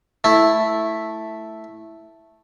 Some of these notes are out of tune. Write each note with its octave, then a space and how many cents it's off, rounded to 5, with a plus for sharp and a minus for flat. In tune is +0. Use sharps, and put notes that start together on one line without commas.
A3 +0 E4 +0